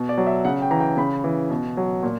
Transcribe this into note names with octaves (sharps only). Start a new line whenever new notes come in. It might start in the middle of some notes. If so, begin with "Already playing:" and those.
Already playing: B2
D5
F#3
E5
C#3 F#5
G5
E3 A#5
G5
C#3 B5
E3
B2
F#3
A#2